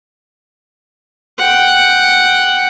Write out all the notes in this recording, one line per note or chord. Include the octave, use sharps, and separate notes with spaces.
F#5 G5